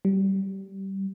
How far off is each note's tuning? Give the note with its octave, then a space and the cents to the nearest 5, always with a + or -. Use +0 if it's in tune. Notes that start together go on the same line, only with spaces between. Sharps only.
G3 -20